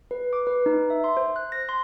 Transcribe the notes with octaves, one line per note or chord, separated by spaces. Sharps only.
B4
D6
B4
D#4
E5
C6
C5
F#6
A#6
C6